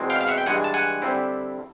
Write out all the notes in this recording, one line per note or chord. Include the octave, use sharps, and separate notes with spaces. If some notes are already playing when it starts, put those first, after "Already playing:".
Already playing: E2 B2 G#3 C4
F5 G5
F5
E5 F#5
G5
G2 E3 G#3 F#5 G#5
A5
F#5 G#5
D3 G3 C4 E4